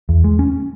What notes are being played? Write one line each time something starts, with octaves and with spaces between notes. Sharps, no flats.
E2
G#3
C#4